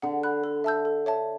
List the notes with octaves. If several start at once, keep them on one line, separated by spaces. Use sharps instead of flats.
D3 F#5
B5 F#6
A4
E5 A5 E6 G6
A4
C#5 E5 A5